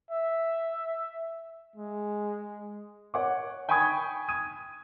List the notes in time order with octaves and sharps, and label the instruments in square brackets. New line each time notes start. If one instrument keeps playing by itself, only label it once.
[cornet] E5
G#3
[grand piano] C#5 F#5 D6
G5 G#5 B5 C#6 D#6 G#6
D#6 G#6 D#7